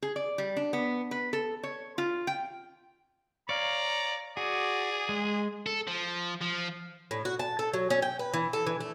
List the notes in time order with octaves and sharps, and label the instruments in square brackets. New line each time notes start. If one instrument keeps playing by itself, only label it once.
[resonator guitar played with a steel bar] G#4
D5
G3
D4
B3
B4
A4
C#5
F4
G5
[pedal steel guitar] C#5 F5 [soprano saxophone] D5 [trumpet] A#5
[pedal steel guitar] F#4 [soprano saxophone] G#4 [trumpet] D5
[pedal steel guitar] G#3
[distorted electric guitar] A4
F3
F3
[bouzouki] A2
F#4
A5
A4
F#3
C#4
G5
B4
E3
A4
E3
A3